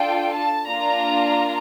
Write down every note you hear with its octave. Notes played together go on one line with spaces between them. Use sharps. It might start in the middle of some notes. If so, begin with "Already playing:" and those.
Already playing: D4 F4 A4 G5
A5
A#3 D4 F4 A#5